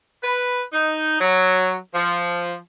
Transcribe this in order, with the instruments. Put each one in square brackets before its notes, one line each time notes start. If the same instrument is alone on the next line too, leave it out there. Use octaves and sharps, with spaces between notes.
[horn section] B4
D#4
F#3
F3